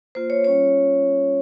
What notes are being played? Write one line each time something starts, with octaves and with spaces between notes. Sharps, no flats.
A#3 F4 C5
C#5
G3 C#4 F4 C#5